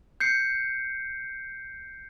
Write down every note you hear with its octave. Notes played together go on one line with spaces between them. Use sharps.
G6 C7 C#7